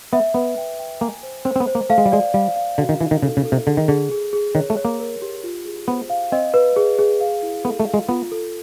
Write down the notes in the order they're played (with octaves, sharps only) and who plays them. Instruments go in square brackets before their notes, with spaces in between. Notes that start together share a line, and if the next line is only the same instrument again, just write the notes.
[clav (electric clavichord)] B3 [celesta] E5
[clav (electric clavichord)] B3 [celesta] B4
[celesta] G5
G5
[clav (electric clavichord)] A#3 [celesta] G#5
[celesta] C5
[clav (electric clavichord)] C4 [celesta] C5
[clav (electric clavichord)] C4
B3
[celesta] C5
[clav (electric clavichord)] A#3
[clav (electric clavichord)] A3 [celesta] F5
[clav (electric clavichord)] G#3
G3
[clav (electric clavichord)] G#3 [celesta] D5
[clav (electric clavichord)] G3 [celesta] F5
[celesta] F5
[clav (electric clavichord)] D3 [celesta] F#4
[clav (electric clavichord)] D#3
[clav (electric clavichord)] E3 [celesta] D#4
[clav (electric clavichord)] D#3
[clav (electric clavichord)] C#3 [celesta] A4
[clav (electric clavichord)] C#3
[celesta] A4
[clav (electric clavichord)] C3
[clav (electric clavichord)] D3 [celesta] G#4
[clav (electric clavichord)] D#3
[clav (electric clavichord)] D3 [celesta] G#4
[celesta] G#4
G#4
[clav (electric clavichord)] D#3 [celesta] C#5
[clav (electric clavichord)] A3
[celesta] C#5
[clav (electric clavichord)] A#3
[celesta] A#4
G4
F4
G#4
[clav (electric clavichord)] B3 [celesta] C5
[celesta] F5
[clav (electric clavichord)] C4 [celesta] D#5
[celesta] B4
G#4
G#4
F5
E4
[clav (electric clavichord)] B3 [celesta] A4
[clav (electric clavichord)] A3
[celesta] F5
[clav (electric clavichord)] G#3
[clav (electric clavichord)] B3 [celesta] F4
[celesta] A4